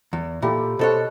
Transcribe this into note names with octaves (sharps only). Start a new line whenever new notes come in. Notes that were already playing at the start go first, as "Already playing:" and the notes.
E2
A#2 E4 G4 A4
B2 A4 C5 C#5 D#5 F#5